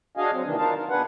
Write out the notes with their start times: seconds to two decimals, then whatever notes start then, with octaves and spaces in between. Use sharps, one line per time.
0.17 D4 F#4 G#4 D#5 F5 G#5
0.32 F#3 C4
0.45 C3 D#3 E3 A#3 D4
0.57 D4 D#4 F4 A#4 F5 A5
0.75 A#4
0.89 B2 D4 G#4 B4 F#5